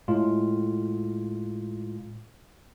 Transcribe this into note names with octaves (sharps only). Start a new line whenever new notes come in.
A2 G#3 F4